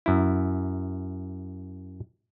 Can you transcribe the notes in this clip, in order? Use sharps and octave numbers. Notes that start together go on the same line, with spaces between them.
F#2 E4